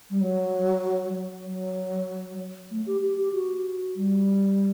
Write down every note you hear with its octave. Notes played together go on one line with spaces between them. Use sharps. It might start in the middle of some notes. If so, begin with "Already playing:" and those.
G3
F#3
F#3
A3
G4
G4
G4
F#4
G3